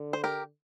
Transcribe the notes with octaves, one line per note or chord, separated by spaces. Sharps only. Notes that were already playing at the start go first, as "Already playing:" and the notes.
Already playing: D3
C5
G4 A#4